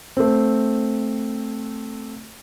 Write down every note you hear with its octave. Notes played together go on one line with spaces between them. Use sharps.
A3 C4